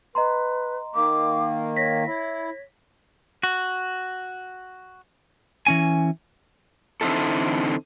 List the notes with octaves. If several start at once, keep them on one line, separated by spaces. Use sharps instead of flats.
B4 D#5 A#5 C6
D#3 A#3 D6
C#5 A#6 B6
E4 C#5
F#4
E3 C#4 G#5
D3 E3 C4 D#4 E4 A4